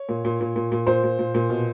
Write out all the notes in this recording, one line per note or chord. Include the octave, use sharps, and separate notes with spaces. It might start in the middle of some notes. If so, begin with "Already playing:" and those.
Already playing: C#5
A#2
A#2
A#2
A#2
A#2
A#2 C5
A#2
A#2
A#2
B2